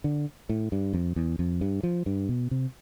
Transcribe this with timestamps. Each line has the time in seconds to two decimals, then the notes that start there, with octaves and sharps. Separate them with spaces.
0.04 D3
0.49 A2
0.72 G2
0.93 F2
1.16 E2
1.39 F2
1.61 G2
1.83 F3
2.06 G2
2.29 B2
2.51 C3